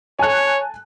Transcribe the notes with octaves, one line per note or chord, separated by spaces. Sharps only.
C#5 G#5 A5 F#6